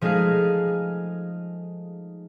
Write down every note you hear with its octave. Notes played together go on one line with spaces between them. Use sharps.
F3 G#3 A3 D#4 G#4 F5